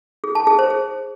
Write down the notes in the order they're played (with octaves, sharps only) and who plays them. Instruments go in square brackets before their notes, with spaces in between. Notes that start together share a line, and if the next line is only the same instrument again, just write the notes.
[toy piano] G#4
A5
G#4
C5
G#4